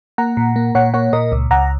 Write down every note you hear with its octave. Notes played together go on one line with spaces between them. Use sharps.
A#3 F#5 A#5
A#2
A#3
A#2 C#5 F#5
A#3 C#5 F#5
A#2 A#4 D#5
C#2
C#2 F#5 A#5